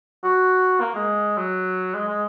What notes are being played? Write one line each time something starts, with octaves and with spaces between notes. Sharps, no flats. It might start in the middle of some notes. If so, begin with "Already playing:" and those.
F#4
A#3
G#3
F#3
G#3
G#3